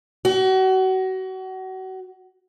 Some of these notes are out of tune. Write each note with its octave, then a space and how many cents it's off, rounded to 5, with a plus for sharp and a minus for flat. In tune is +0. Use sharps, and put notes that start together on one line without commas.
F#4 +30